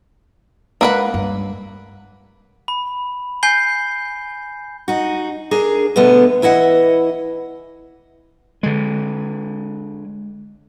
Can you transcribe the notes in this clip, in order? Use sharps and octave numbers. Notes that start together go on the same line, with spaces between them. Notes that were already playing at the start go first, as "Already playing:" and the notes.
G#3 A#3 C#4 B4 F#5
G2
B5
G#5 G6 C7 G7
D#4 F#4
D4 G#4 A#4
B2 D3 A3 B3
E3 E4 D#5 F#5
D3 G#3